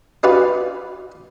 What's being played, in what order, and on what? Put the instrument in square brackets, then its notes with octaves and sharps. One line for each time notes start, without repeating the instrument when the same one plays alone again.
[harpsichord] D4 F4 F#4 B4 D5